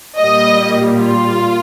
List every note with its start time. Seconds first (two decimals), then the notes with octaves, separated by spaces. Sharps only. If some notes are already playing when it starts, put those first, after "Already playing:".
0.18 A#2 G3 A#3 D#5
0.98 F4